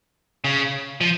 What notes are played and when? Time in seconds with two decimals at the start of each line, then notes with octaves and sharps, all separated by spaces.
0.44 C#3
1.01 F3